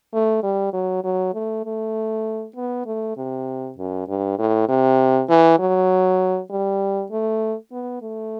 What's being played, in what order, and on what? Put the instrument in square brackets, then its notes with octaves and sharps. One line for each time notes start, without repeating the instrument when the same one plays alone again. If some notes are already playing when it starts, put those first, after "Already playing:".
[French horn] A3
G3
F#3
F#3
A3
A3
B3
A3
C3
F#2
G2
A2
C3
E3
F#3
G3
A3
B3
A3